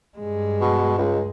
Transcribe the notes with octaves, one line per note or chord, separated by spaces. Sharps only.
G2 G#3
B2
C#2